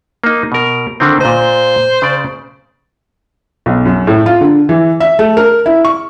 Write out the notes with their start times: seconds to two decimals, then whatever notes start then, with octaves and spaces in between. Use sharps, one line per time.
0.24 A#3 D#4
0.52 B2 A#4
1.00 D3 D#3 C4
1.21 A#2 C5 D#5
2.02 C#3 D5
3.66 B1
3.85 F#2
4.07 A2
4.26 F4
4.41 D3
4.69 E3
5.00 E5
5.19 A3
5.37 A#4
5.66 E4
5.85 C#6